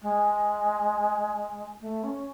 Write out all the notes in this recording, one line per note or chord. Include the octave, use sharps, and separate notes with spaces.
G#3
A3
C#4